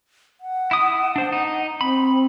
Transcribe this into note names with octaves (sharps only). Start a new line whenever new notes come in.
F#5
E4 D#6
D4 C5
D#4
C4 B5